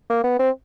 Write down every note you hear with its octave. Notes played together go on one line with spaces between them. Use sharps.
A#3
B3
C4